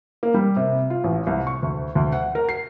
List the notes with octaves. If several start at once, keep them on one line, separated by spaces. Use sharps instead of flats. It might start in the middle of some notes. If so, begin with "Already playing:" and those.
A#3
G3
C3
F4
A1
C2
C#6
D2
D2
F#5
A#4
C7